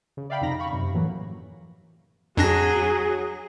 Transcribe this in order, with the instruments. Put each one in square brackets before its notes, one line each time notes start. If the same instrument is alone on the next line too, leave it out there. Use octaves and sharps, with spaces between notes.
[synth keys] C#3
D5 E5 F5 G5 B5
F2 C3 D#4 A#5 B5 A#6
F5 B5 C#6
F#2 C3
A2 E3 F#3 A#3
[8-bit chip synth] F2 D4 A#6 [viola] F#3 G#4